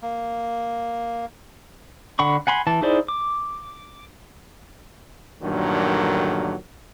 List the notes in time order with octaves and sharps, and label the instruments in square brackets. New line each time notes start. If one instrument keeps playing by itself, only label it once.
[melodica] A#3
[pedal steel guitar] D3 F#5 B5 C#6
F#5 G#5 B5 C6
E3 A5
D#4 E4 G#4 C5 D5
D6
[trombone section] D2 G2 A#2 D3 D#3 F#3